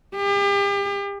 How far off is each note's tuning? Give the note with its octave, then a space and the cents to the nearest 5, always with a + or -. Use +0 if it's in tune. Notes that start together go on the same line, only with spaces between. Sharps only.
G4 +40